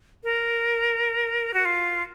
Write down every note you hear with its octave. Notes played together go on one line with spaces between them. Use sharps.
A#4
F#4
F4